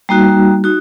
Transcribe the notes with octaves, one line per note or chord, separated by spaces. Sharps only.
G3 A#3 D#4 F#4
D#4 F#4